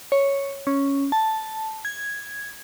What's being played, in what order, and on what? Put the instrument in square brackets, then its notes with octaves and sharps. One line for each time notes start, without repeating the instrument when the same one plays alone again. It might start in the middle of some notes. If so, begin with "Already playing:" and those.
[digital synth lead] C#5
C#4
A5
G#6